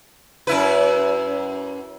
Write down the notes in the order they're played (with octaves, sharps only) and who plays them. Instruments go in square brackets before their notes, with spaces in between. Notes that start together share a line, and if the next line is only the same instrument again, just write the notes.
[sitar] F#2 E4 B4